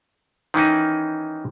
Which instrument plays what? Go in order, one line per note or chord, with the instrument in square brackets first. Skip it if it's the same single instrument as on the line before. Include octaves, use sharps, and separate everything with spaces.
[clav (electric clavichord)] D#3 E3 C#4 D#4